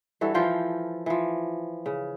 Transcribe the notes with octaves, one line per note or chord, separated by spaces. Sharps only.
G2 E3 F#4 A4
E3 F3 F4 G5
E3 F3
C#3